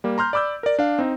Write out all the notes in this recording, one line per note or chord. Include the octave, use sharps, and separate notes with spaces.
G3 A#3
A#5 C6 F6 G6
D5 B5 D6 E6 G6
A#4 D5
D4 F5
C4 D#4